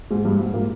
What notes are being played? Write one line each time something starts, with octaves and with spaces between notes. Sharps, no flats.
G#2 G#3
G2 G3
G#2 G#3
A#2 A#3